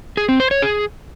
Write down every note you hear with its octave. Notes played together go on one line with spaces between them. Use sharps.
G#4
C4
C5
C#5
G#4